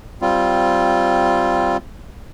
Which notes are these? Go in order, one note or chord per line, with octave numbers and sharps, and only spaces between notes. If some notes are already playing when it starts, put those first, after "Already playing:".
G3 C4 F4